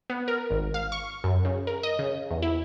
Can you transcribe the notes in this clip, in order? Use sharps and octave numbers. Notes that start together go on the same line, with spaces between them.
B3
A#4
G#1
F5
C#6
F#2
C#3
A#4
D#5
C#3
E2
E4